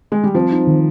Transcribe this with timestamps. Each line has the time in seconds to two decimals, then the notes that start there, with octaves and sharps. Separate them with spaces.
0.12 G#3
0.24 G3
0.34 F3 C4
0.51 D#4
0.67 D#3